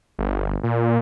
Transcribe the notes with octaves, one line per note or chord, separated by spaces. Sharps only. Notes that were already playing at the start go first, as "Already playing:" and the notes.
G1
A#2